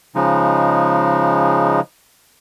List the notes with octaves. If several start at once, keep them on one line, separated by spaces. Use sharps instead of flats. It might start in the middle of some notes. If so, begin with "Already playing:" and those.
C#3 F3 G#3 D#4